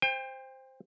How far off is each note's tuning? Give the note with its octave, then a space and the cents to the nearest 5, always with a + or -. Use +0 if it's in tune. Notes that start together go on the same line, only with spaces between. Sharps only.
C5 +0 G5 +30